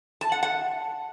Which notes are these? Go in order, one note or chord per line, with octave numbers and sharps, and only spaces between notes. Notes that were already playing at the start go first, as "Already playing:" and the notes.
A5
F#5
F#5